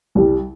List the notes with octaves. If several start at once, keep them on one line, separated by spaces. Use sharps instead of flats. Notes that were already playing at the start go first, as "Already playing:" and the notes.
C2 G3